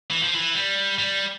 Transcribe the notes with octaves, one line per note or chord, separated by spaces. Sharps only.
E3
F3
E3
G3
G3